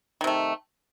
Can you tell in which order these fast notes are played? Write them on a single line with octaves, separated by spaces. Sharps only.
D#3 C3 A3